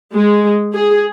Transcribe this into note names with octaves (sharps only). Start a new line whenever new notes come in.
G#3
G#4